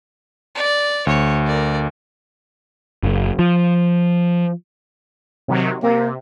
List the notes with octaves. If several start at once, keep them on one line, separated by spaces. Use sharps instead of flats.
D5
D2 C#5
A#4 D5
F#1
F3
C3 D#3 F#3
C3 A#3